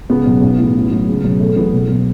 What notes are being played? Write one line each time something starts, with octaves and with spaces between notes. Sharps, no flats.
C#2 B3
B2 F#3
B1
A2 E3
A1
A2 F#3
C#2
B2 F#3
E1 A3
E2 B2 F#3 B3
E1
B2 F#3